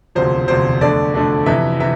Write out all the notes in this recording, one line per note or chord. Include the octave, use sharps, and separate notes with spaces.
E1 D2 C3 F3 C5
E1 D2 C3 F3 C5
F2 D3 A3 D4 D5
F2 D3 A3 D4
F2 C3 E3 E5
C3 E3 E5